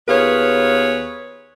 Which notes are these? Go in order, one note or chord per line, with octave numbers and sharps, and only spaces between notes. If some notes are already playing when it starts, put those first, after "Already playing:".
D#2 B3 F4 G#4 B4 C#5